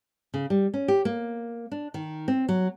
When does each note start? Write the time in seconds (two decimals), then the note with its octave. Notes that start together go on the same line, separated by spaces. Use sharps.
0.34 C#3
0.50 G3
0.74 C#4
0.88 G4
1.05 A#3
1.72 D4
1.94 D#3
2.28 C4
2.49 F#3